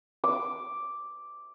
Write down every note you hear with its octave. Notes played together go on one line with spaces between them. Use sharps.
D6